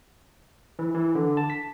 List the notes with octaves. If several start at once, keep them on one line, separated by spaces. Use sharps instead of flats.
E3
E3
D3
A5
B6